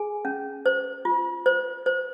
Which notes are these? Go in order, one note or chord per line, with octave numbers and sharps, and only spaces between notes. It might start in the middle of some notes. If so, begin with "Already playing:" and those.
Already playing: G#4 G#5
C#4
C5
F4
C5
C5